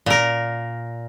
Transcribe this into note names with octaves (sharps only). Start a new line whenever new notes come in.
A#2 A#4